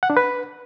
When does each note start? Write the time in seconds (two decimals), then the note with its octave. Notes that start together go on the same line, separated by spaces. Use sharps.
0.03 F#5
0.10 D4
0.17 B4